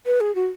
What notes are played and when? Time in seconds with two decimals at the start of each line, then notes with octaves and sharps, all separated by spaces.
0.06 B4
0.21 G#4
0.35 F#4